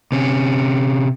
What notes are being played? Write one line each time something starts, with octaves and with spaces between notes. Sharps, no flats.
C3 C#4